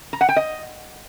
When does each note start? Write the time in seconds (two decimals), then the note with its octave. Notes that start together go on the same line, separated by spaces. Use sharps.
0.13 A#5
0.21 F#5
0.29 G5
0.36 D#5